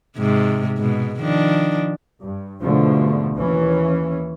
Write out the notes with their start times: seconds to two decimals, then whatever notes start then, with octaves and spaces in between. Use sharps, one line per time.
0.17 G#2 C3
0.78 G#2 B2
1.21 D#3 F3 D4
2.22 G2
2.63 G#2 B2 D3 F3 A3
3.34 D#2 E3 C#4